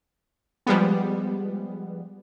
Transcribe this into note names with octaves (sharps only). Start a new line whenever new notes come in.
F3 G3 G#3 B3